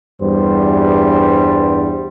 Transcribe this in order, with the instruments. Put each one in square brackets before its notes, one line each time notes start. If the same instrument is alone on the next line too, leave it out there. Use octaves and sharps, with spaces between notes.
[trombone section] E2 G2 G3 C5